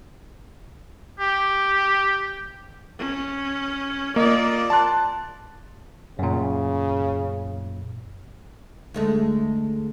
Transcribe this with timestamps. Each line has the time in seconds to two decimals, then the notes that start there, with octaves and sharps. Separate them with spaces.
1.20 G4
2.99 C#4
4.16 A#3 F4 D5 D#5
4.70 A5 C6 F#6
6.19 F#2 A#2 C#3
8.94 D2 G#3 A3